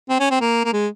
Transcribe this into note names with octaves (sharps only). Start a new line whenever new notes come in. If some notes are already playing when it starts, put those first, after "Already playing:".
C4
C#4
C4
A#3
A#3
G#3